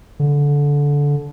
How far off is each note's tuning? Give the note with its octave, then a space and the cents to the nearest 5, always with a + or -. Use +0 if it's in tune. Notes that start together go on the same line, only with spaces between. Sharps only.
D3 -20